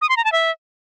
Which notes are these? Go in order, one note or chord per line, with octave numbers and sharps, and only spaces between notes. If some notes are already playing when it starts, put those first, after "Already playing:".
D#6
C6
A#5
A5
E5